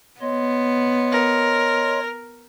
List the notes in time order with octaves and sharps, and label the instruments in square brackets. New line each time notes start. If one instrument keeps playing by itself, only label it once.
[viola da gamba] B3 [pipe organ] C#5 D#5 C6
[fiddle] A#4